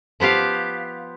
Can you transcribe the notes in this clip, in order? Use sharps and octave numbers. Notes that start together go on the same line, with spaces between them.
F3 B3 G4 F5